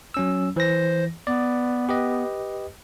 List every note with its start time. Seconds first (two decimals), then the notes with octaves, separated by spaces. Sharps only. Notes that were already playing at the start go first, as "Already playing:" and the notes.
0.14 F#3 C#4 E6
0.56 E3 C5 A#6
1.27 B3 D5
1.89 G4 B4 D#5